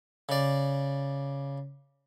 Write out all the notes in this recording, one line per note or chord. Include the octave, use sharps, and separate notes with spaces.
C#3 D5